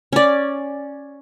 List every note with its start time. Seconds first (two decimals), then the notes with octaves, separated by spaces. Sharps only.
0.13 C#4 D5